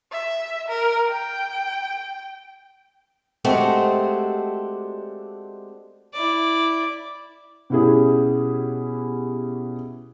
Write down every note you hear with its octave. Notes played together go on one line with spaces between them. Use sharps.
E5
A#4
G5
G#3 A3 C4 D4 F#4 G4
E4 D5
B2 C#4 E4 G4 G#4